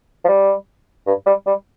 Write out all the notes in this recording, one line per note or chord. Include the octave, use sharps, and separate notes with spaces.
F3
G3
G2
G3
G3